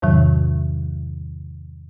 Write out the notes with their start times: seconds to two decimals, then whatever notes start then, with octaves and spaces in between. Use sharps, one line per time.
0.02 E2 G#2 C3 D#3 F#3